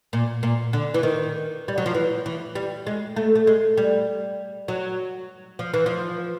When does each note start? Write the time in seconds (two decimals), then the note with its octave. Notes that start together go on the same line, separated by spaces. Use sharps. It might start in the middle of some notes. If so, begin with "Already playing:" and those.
0.13 A#2
0.43 A#2
0.73 D3
0.94 E3
1.03 D#3
1.68 G3
1.78 F#3
1.86 F3
1.95 E3
2.26 E3
2.55 G3
2.87 G#3
3.16 A3
3.35 A3
3.47 G#3
3.77 G3
4.68 F#3
5.59 F3
5.74 E3
5.86 F3